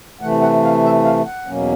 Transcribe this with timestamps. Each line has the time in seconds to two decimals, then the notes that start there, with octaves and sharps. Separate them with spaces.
0.21 C3 E3 A3 F#5
0.42 F#5
0.63 F5
0.84 E5
1.05 F5
1.25 F#5
1.46 E2 B2 F#3 A#3 C#4